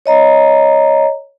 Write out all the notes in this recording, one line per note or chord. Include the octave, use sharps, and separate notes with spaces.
C#5 D#5 A#5